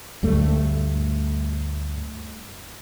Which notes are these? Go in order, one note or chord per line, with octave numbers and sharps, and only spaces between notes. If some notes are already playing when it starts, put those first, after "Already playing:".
D2 G2 A3